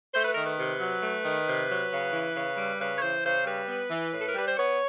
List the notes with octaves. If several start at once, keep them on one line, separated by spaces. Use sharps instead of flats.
A3 C5
B4
D#3 A#4
B4
C3
F#3
A3
D#3
C3
F#3
C#3
E3
C#3
G3
C#3 B4
C#5
E3 C5
C#3 C5
G3 B4
B3
E3
A2
A4
A#4
G3 B4
C5
B3 C#5